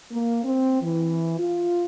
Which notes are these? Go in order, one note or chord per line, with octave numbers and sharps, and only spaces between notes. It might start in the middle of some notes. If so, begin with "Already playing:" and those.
A#3
C4
E3
F4